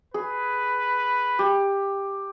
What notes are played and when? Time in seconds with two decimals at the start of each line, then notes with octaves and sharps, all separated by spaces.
0.14 G#4 B4
1.39 G4